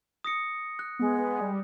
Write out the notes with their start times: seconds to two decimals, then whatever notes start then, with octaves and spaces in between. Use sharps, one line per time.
0.24 D#6 A#6 C#7
0.79 F#6
0.99 G#3 B3
1.41 G3